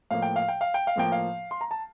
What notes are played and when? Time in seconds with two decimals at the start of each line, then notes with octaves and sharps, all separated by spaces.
0.10 A2 F3 A#3 F5
0.22 G5
0.36 F5
0.48 G5
0.61 F5
0.74 G5
0.87 F5
0.96 A2 F3 A#3 G5
1.12 F5
1.51 C6
1.61 A#5
1.71 A5